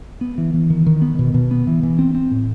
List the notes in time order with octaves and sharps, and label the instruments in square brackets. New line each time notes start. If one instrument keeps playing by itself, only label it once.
[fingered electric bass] B3
E3
E3
D#3
D#3
B3
B2
B2
B3
E3
E3
C4
C4
A2